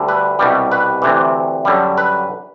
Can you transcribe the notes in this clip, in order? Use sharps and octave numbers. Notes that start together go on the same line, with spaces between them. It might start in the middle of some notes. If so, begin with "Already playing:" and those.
Already playing: D2 D3 G3
B4
C2 B2 G3
B4
D2 C3 E3
F#2 D3 G3
B4